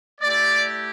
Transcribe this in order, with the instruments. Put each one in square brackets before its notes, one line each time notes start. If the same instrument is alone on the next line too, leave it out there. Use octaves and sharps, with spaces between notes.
[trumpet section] A3 E4 G4 D5